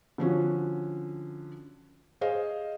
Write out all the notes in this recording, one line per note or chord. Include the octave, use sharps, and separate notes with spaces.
D3 F3 C#4 F#4
G#4 C5 D#5 F5